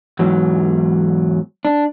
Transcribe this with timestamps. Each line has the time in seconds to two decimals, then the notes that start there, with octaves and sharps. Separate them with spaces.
0.19 E2 G#2 F#3
1.65 D4